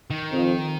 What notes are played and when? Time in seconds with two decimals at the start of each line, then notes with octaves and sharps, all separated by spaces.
0.10 D#3
0.32 F2 F3